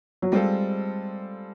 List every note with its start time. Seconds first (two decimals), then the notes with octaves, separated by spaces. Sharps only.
0.22 F#3
0.32 G3 G#3 C4 F4 A4